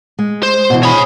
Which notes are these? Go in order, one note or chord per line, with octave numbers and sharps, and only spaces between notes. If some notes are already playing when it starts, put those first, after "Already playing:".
G#3
C5
B2 D3 E3
G#4 C#5 B5